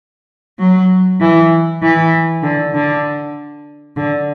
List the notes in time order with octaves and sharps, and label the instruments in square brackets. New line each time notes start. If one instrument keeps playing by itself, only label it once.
[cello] F#3
E3
E3
D3
D3
D3